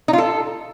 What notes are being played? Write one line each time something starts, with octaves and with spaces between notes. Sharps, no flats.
D#4
F4
A4